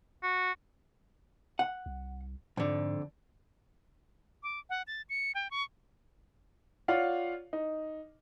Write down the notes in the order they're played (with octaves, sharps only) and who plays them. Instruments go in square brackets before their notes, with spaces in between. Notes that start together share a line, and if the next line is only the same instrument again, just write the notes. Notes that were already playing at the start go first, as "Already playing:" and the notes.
[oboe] F#4
[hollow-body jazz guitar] F#5
[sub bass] C2
[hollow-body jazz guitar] F2 D3 [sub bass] G#2
[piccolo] D6
F#5
A6
C#7
G5
C#6
[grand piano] F4 C#5 D5 F5 F#5
D#4